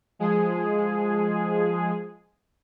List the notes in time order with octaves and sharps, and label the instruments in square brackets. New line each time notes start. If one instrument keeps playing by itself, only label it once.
[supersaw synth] F3 G#3 G#4